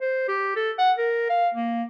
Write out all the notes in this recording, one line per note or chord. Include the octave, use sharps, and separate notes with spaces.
C5
G4
A4
F#5
A#4
F5
A#3